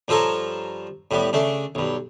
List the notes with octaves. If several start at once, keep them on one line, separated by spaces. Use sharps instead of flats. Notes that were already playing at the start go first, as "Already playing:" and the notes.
G2 F3 F4 A4 C#5 A#5
A2 G3 B3
C#3 A3 D4
B1 G2